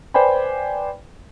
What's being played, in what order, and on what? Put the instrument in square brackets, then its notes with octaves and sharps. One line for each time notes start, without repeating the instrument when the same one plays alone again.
[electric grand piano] B4 C5 D5 G5 G#5 B5